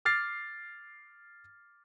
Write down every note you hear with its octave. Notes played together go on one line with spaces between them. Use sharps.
D6 F6 A6 C7